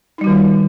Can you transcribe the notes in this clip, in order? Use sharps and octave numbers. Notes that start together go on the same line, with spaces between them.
D#3 G3 D#4 F4 F#4